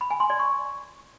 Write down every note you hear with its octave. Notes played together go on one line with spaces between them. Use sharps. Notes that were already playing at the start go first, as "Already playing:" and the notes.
B5
G#5
C6
D5
C#6